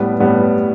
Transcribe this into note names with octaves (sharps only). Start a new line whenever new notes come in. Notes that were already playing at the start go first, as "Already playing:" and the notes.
Already playing: A2 G3 B3
A2 G3 B3